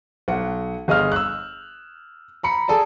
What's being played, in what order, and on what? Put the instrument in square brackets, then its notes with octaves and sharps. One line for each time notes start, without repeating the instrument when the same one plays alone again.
[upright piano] B1 F#5
G1 G#4 D#5 F5 F6
E6 F#6
A#5 B5 C#7
G#4 A4 D5 A5